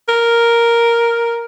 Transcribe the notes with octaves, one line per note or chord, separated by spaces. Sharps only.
A#4